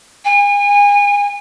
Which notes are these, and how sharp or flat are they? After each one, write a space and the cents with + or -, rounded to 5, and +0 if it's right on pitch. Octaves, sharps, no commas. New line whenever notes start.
G#5 -35